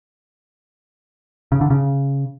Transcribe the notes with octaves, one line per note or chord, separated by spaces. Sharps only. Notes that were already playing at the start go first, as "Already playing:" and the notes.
C#3
D3
C#3